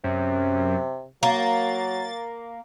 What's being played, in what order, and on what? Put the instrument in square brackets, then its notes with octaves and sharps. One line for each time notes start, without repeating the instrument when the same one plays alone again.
[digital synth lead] F#2 [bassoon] C3
[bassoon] F#3 [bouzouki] A#3 [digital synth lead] A6